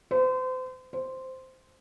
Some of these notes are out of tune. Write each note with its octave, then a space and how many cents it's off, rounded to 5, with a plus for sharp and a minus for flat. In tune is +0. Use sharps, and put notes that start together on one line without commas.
C5 -35
C5 -5